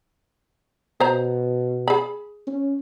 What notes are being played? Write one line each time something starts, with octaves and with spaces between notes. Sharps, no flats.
B2 C5 A#5
G#4 B5
C#4